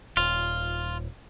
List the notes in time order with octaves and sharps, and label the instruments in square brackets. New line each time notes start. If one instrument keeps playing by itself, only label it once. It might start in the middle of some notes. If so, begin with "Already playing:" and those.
[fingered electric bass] D#1 [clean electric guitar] F4